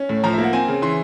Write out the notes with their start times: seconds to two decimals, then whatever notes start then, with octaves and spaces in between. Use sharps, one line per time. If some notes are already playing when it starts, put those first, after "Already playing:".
Already playing: C#4
0.09 A2
0.24 F3 A#5
0.33 A#3 E5
0.44 F#5
0.53 C4 G#5
0.68 C#3
0.82 E3 C6